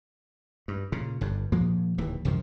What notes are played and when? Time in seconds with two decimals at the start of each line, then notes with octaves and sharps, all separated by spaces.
0.68 G2
0.92 A#2 C#3
1.21 G1 G2
1.52 A#2 F3 G#3 A#3
1.98 D1 D#2 E3
2.25 C2 F#2 D#3 F3